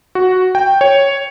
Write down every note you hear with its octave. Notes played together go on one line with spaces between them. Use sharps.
F#4
G5
C#5